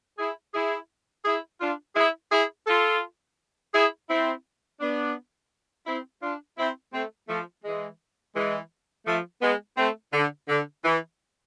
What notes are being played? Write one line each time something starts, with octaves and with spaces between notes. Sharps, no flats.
E4 G#4
E4 G#4
E4 G#4
D4 F4
E4 G#4
E4 G#4
F4 A4
E4 G#4
C4 E4
B3 D4
C4 E4
D4 F4
C4 E4
A3 C4
F3 A3
E3 G#3
E3 G#3
F3 A3
G#3 B3
A3 C4
D3
D3
E3